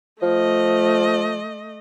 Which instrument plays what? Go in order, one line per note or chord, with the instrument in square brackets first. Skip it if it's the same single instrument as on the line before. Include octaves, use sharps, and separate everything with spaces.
[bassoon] F3 [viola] A3 D#5